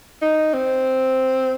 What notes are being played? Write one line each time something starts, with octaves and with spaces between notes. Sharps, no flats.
D#4
C4